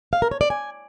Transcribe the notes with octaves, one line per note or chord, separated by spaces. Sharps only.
F5
A#4
C#5
D5
G#5